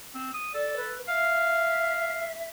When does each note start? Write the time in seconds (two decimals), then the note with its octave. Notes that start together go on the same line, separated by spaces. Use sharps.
0.15 C4
0.33 D#6
0.54 A4 D5
0.77 B4
1.08 E5 F5